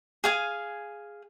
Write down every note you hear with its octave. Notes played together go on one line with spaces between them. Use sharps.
G#4 F5 G#5